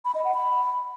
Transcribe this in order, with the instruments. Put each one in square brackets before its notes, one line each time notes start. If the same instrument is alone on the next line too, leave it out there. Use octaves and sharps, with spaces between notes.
[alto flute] B5
D#5
F#5
B5